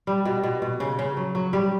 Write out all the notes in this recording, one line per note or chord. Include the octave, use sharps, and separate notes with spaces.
G3
B2
B2
B2
C#3
C#3
F#3
F#3
G3 G4